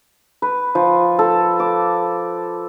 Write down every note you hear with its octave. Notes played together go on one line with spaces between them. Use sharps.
B4
F3
A4
D6